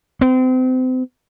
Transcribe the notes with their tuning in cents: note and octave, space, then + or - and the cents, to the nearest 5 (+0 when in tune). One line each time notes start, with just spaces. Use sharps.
C4 -35